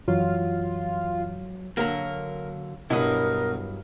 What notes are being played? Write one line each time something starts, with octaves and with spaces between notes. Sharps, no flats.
F#2 E3 F#3 F4
D3 F#3 A#3 A#4 A#5
G2 B2 F#3 E4 A#4 D#6